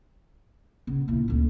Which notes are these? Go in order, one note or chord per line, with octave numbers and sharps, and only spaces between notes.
C#3 B3
A#2 E4
D2 D3